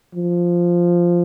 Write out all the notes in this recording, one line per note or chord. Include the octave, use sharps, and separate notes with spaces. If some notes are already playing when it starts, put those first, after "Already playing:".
F3